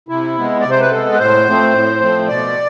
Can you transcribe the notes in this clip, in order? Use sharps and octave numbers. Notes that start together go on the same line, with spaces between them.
C3 E4
G#3 B3
C3 D5
C5
B4
G#3 B3 A4
B4
A2 C5
F3 A3 C4
A2
F3 A3 C4
B2 D5